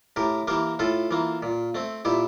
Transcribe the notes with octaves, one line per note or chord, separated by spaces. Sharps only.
A2 G4 A#4
E3 A#3 G4 A#4
A2 F4 A4
E3 A#3
A#2
A3 C4
A#2 E4 G4